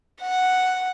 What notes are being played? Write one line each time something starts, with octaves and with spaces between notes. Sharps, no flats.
F#5